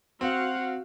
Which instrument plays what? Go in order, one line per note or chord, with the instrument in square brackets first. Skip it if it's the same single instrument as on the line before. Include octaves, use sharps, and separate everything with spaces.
[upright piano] C4 [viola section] F#4 F5 F#5